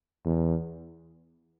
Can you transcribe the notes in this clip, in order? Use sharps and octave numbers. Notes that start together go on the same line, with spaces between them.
E2